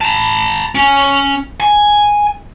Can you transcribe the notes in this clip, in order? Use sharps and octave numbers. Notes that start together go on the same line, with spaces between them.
A5 A#5
C#4
G#5